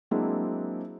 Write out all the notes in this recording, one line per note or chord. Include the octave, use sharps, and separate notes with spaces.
F#3 G#3 A#3 C4 D4 E4